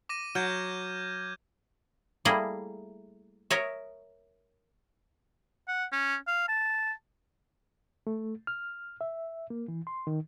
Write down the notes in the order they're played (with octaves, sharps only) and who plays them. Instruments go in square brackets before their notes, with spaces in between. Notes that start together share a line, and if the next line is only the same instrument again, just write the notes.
[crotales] D6 A#6 D#7
[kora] F#3 [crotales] F6 G6 G#6
[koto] G3 A3 A#3 E4 G#4 D#5
A#4 C#5 D#5 E5
[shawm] F#5
C#4
F5
A5
[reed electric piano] A3
F6
E5
A#3
E3
C6
D#3